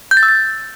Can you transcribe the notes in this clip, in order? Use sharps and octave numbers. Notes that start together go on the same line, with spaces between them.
G6
A6
E6
A6